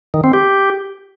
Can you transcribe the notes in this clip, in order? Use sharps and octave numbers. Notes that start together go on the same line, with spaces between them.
D#3
C4
G4